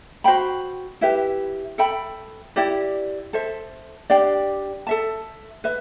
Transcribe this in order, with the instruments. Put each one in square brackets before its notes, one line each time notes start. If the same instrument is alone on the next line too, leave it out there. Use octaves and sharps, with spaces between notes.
[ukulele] F#4 C5 G5 B5
E4 G4 B4 E5
A4 E5 G5 B5
E4 G4 D5
A4 C5 E5
D4 G4 D5 G5
A4 E5 A5
B4 E5